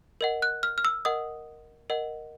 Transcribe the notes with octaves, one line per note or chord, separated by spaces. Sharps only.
A#4 D#5 F#5
F#6
F6
F6
E6
A#4 D#5 F#5 D#6
A#4 D#5 F#5